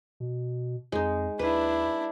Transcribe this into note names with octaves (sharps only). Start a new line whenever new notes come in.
B2
F2 G#3 D#4
D#2 D4 E4 B4